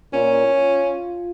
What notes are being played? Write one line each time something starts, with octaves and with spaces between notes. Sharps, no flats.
A#2 C#4
F4